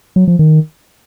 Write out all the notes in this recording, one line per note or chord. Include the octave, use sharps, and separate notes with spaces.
F#3
F3
D#3